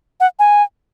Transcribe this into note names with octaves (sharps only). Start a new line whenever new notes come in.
F#5
G#5